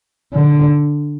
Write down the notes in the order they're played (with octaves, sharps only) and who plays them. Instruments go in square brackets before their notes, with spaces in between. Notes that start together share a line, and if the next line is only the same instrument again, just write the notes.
[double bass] D3